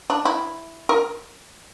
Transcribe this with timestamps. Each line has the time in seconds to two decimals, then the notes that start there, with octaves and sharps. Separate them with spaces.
0.10 D4
0.25 E4
0.89 A#4